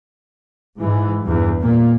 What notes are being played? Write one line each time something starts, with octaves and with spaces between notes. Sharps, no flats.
G#2 E3
E2 G2
A#2 A#3